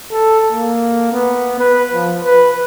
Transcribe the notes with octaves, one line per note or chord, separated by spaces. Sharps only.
A4
A#3
B3
B4
F3
B4